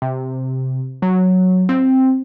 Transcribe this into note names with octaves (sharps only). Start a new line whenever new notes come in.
C3
F#3
C4